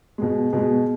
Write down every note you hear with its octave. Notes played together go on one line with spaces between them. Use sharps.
B2 G#3
B2 G#3